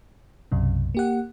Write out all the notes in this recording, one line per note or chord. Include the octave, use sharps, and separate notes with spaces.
B1 F#2 C3
A#3 G4 F#5